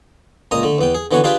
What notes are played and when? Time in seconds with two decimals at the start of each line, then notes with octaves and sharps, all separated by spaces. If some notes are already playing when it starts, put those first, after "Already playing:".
0.51 C#2 A#2 D#5 A#5 D#6
0.63 D3 A3
0.78 E2 B3 G5
0.95 G#4
1.11 D3 E3 B3 F#4 C#5
1.24 D4 F4 G4 G#4 B4 D5